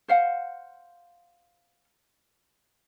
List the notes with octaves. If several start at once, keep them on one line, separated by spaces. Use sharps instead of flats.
C5 F5 F#5